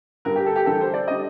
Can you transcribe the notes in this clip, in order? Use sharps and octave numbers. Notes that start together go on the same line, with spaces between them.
G2 D3 G3 A#4
G4
A4
G4
A1 G2 D3 G3 A4
C5
D5
D3 G3 D#5